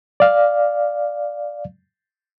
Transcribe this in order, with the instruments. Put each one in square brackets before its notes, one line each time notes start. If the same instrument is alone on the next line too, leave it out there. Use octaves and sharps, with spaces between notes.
[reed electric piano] D5 F5